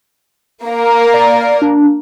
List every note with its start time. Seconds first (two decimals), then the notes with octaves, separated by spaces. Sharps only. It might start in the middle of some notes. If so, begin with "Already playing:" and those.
0.64 A#3 A#4
1.14 D5
1.62 D4